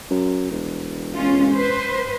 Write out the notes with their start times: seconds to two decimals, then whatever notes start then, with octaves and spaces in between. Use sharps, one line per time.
0.11 F#2
0.51 E1
1.15 G#3 C#4 F4
1.52 B4 C5